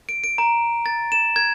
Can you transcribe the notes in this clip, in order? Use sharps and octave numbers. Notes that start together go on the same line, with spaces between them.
D7
D7
A#5
A6
E7
G#6